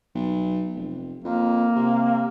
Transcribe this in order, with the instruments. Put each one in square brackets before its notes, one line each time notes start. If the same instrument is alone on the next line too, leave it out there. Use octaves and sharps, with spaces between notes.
[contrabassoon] B1
F1
[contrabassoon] F2 [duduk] A#3
[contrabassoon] C3